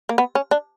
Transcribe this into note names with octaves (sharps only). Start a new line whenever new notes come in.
A#3
B3
C#4
D4